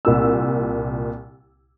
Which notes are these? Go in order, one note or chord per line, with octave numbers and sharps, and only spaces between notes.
C2 A#2 E6